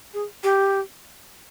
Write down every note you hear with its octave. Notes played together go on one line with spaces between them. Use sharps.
G#4
G4